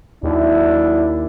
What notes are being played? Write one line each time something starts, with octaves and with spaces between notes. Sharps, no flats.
D#2 F#3 D4 E4